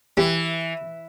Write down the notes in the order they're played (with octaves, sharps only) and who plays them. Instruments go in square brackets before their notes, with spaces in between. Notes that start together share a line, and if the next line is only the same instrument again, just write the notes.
[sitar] E3 [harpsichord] G3